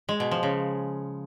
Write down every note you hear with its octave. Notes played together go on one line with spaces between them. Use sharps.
G#3
B2
F3
C#3